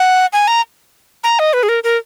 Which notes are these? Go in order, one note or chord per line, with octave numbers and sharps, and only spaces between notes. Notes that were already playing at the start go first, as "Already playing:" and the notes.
Already playing: F#5
G#5
A#5
A#5
D#5
B4
G#4
A#4
A#4